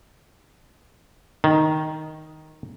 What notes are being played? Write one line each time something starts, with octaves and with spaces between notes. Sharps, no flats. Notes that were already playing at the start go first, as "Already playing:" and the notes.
D#3